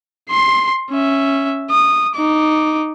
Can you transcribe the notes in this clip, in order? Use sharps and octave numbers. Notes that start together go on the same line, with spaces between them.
C6 C7
C#4 E5
D#6
D#4 D6